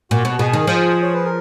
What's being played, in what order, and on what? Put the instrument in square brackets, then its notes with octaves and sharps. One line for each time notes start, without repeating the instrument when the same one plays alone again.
[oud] A#2 [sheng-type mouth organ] F#4
[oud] B2
[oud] B2 [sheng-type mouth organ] G#4
[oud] D#3
F3
[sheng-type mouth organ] C#5
B4
A#4